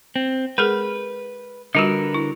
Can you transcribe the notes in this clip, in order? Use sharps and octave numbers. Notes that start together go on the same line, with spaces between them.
C4
G#3 G#4 A#4 B4
D3 G3 F4 F#4 A#4 B4
E4